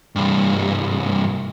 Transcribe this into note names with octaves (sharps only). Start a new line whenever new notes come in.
C2 G2